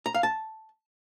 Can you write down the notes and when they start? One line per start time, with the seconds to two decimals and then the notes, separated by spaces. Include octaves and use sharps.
0.06 A#5
0.14 F5
0.23 A5